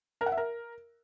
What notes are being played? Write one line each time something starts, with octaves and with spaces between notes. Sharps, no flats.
A#4
F#5
E5
A#4